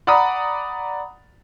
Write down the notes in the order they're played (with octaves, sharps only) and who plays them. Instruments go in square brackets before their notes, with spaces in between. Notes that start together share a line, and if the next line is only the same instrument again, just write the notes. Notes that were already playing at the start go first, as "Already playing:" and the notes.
[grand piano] D5 F#5 A#5 B5 D#6